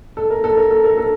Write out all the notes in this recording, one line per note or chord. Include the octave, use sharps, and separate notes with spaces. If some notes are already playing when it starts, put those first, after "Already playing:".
A4
A#4
A4
A#4
A4
A#4
A4